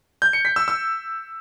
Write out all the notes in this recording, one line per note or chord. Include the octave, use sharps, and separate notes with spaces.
G6
C#7
B6
E6
E6